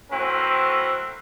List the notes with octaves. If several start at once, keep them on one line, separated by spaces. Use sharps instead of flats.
F#3 A3 C4 E4 A#4 B4